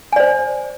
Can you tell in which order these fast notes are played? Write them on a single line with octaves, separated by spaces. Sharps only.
G#5 D5 C5